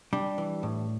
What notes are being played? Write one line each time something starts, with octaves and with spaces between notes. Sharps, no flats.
G3 D4 G4
E3
A2